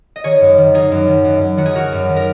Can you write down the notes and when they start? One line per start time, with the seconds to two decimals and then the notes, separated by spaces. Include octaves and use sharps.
0.16 D#5
0.24 D#3 G#4 C#5
0.41 F#2
0.58 D#3
0.74 D#3 D#4 G#4
0.92 F#2
1.07 D#3
1.24 F#2
1.41 F#2
1.57 D#3 F#4
1.66 G#4
1.75 D#3 F#4 A#4
1.92 F#2
2.08 D#3
2.16 A#4